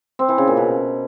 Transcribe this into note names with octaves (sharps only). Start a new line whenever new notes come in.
C4
E3
C#3
A#2
B2